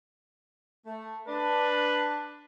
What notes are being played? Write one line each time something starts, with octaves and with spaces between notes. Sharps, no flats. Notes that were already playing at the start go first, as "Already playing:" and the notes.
A3
D4 B4